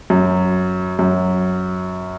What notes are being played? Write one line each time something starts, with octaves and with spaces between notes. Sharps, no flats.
F#2
F#2